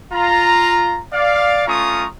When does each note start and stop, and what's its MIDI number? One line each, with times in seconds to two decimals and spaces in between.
0.13 1.01 65
0.13 1.01 82
1.13 1.66 74
1.13 1.66 77
1.67 2.06 57
1.67 2.06 61
1.67 2.06 65
1.67 2.06 82
1.67 2.06 85
1.67 2.06 87